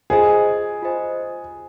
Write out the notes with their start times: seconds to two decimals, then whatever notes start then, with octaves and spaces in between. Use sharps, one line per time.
0.10 F4 G#4 C5 D#5 G#5
0.82 F4 C5 D#5 G#5